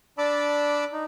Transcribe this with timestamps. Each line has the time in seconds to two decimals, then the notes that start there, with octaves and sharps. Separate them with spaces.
0.18 D4 D5 A5 B5 D6 E6
0.93 D#4